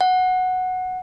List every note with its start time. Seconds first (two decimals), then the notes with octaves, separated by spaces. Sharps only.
0.01 F#5